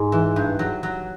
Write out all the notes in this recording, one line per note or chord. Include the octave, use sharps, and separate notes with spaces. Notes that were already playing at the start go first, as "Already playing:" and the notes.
Already playing: G#2 G#3 G#4
E3
G2
F#3
F#3